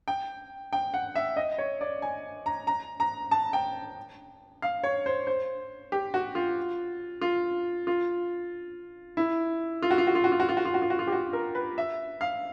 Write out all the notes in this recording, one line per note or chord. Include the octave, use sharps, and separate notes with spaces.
G5
G5
F#5
E5
D#5
C#5
D5
G#5
A#5
A#5
A#5
A5
G5
F5
C#5
C5
C5
G4
F#4
F4
F4
F4
E4
F4
F#4
F4
F#4
F4
F#4
F4
F#4
F4
F#4
F4
F#4
F4
F#4
F4
G4
F#4
A#4
B4
E5
F5